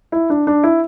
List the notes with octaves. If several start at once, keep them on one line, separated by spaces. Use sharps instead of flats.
E4
D4
D4
E4